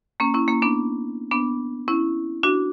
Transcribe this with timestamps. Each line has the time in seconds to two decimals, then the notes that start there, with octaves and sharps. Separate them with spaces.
0.20 A#3 C#4
0.34 C#4 E4
0.48 A#3 C#4
0.62 B3 D4
1.31 B3 D4
1.88 C#4 E4
2.43 D4 F#4